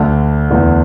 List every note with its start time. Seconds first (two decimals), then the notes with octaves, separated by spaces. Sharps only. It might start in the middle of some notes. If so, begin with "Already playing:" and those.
Already playing: D2 D3
0.50 E2 E3